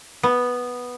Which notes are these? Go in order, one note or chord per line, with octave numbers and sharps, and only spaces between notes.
B3